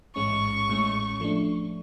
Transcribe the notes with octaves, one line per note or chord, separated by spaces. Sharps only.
A1 G#2 G#3 C#4 C#6
A1 A2 G#3 C#4
F3 A3 D4